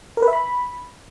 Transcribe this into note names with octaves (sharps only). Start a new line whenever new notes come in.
A#4
B4
E5
B5